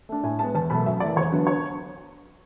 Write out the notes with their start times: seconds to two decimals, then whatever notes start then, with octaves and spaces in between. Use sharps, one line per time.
0.09 A3 D4
0.23 A2 G#5
0.39 G#3 A5
0.43 B3
0.55 E2 A5
0.70 B2 F#3 A3 B5
0.86 F#2 E5
1.00 E3 A3 D5
1.16 E2 C#5
1.32 D3 F#3 B3 D4 B4
1.47 C#5